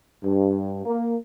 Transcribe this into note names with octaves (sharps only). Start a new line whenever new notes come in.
G2
A#3